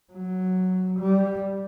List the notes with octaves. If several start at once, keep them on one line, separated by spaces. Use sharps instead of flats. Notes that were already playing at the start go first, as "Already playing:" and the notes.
F#3
G3